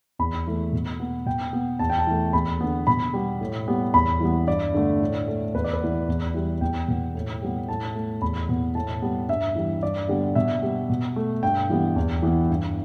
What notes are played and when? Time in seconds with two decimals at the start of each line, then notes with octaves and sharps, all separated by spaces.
0.19 E2 B5
0.47 E3 A3
0.72 B2
1.00 B3
1.26 B2 G5
1.53 B3
1.79 E2 A5
1.90 G5
1.99 A5
2.07 E3 A3
2.33 E2 B5
2.61 D3 B3
2.87 B2 B5
3.13 G3 B3
3.41 A2
3.68 G3 B3
3.94 E2 B5
4.20 E3 G3 B3
4.47 G2 D5
4.74 D3 A3
5.00 A2
5.28 A3
5.55 E2 B4
5.64 D5
5.73 B4
5.81 E3 B3
6.08 E2
6.34 E3 G3
6.61 E2 G5
6.88 B2 B3
7.15 A2
7.42 G3 B3
7.68 A2 A5
7.95 A3
8.22 E2 B5
8.49 B2 B3
8.75 A2 A5
9.02 G3 B3
9.29 G2 E5
9.56 E3 G3
9.83 G2 D5
10.08 D3 G3 B3
10.35 B2 E5
10.62 G3 B3
10.89 B2
11.16 A3
11.43 G2 G5
11.70 E3 G3 B3
11.96 E2
12.22 E3 B3
12.49 G2